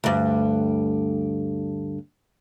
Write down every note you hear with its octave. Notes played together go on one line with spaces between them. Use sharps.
D2 G2